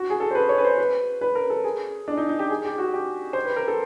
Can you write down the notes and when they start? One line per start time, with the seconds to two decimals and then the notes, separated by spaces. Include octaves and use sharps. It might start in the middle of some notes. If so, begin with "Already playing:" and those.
Already playing: F#4
0.10 G#4
0.20 A4
0.31 C5
0.35 B4
0.49 C#5
0.58 B4
0.64 C5
0.78 B4
1.21 B4
1.35 A#4
1.50 A4
1.64 G#4
2.08 D4
2.17 D#4
2.29 D#4
2.39 G4
2.50 G#4
2.65 G4
2.78 F#4
2.94 G4
3.33 C5
3.45 B4
3.56 A#4
3.68 A4